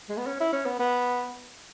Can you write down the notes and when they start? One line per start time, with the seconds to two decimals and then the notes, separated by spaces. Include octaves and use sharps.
0.09 G#3
0.18 B3
0.26 C#4
0.40 E4
0.52 C#4
0.65 B3
0.79 B3